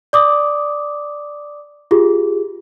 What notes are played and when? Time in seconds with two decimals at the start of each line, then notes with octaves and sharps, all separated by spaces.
0.13 D5 D6 D#6
1.91 F4 G4 G#4